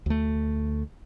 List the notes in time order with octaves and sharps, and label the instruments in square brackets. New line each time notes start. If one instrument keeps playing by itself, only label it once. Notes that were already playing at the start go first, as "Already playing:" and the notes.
[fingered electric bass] D2 A3